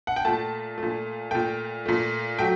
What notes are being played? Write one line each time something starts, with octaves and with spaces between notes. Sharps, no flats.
F#5
G5
A#2 A3 A5
A3
A#2
A#2 A3 G5
A#2 A3
F#3 A3 G5